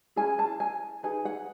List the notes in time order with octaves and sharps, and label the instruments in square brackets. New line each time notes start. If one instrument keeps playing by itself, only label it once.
[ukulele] C#4 E4 G#4 G#5
A5
G#5
D#4 G#4 B4 G#5
F#5